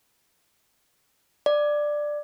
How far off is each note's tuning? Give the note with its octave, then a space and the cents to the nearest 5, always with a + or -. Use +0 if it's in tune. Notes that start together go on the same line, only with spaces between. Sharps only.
D5 +10